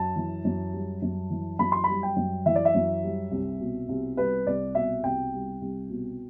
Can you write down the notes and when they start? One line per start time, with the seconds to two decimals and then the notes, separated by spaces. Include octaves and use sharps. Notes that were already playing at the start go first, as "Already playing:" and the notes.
Already playing: F#2 A5
0.16 E3
0.45 F#2
0.73 G3
1.02 F#2
1.30 E3
1.59 F#2 B5
1.72 C6
1.84 G3 B5
2.03 G5
2.16 F#2
2.46 E3 E5
2.55 D5
2.65 E5
2.75 F#2
3.04 G3
3.31 C2
3.60 B2
3.89 C2
4.17 G3 B4
4.47 C2 D5
4.75 B2 E5
5.04 C2 G5
5.33 G3
5.62 C2
5.90 B2